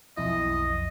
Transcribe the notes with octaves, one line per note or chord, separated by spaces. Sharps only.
B1 F2 E4 D#5